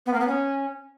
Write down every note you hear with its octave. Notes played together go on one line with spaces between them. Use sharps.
B3
A#3
B3
C#4